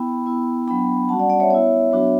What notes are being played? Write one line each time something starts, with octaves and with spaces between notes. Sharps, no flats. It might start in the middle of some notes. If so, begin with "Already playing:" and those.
Already playing: B3 E4 G5 B5
B3 E4
F#3 B3 D4 G5 B5
G3 C#4 F#4 F#5 A5
D5 F#5
D5 F#5
C#5 E5
B3 E4 C#5 E5
F#3 B3 D4 F#4